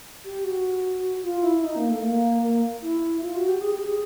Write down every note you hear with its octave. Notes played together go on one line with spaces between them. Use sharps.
G4
F#4
F4
E4
D#4
A#3
A3
A#3
A#3
E4
F4
F#4
G4
G#4
G4
G#4